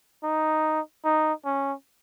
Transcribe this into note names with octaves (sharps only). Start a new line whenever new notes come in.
D#4
D#4
C#4